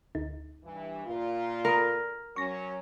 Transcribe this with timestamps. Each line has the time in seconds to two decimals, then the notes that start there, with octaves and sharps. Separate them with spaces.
0.15 D2 D#4
0.63 G2 E3
1.05 A#2 A#3 F4
1.65 A#4 B5 D#6
2.36 F#3 C#4 C#6 A#6